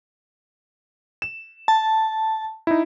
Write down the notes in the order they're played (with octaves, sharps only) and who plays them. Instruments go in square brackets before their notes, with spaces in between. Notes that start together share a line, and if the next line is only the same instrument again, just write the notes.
[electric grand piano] E7
[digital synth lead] A5
[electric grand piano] D#4 E4